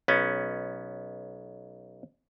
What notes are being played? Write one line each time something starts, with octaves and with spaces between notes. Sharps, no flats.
B1 B3 C#4